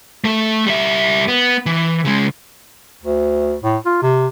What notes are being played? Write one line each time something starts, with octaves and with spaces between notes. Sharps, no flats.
A3 A4
G3 E5
B3
E3
C#3 G#3
D2
A2
F4
C3